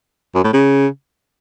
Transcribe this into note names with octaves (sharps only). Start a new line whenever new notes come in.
F#2
A2
C#3